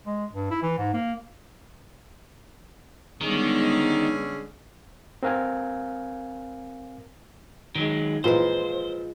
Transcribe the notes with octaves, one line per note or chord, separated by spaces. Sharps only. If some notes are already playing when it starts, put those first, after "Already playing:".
G#3
G2
E4
E3
G#2
A#3
D3 D#3 G3 G#3 B3 C#4 G#4
C4 A#4 F5 G#5
D#3 F#3 G#3
A#2 E3 F3 G#3 C5